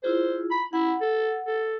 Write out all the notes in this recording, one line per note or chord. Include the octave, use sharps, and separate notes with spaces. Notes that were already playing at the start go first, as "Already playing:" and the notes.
E4 F4 G#4 C5
B5
E4 F#5
A4
A4